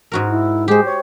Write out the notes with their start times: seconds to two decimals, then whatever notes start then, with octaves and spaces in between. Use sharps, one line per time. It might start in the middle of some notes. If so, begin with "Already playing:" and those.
0.12 G#2 F#4 A#4
0.28 E4
0.68 G#3 G4 C5
0.85 C#5